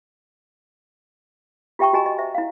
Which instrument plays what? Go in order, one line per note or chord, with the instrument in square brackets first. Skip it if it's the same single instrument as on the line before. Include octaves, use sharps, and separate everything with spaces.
[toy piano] F4 G4 E5 G5 A5 C#6
F#4 G4 D#5 G#5 A#5
D#5
C5 E5
E4 F5